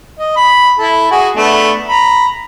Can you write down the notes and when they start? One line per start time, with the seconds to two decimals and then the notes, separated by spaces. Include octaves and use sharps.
0.19 D#5
0.36 B5
0.79 E4 A4
1.11 F#4 G#4
1.36 A3 B3 D4
1.88 A#5 B5